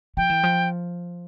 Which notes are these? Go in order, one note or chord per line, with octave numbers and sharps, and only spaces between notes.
F3 G5
E3
F3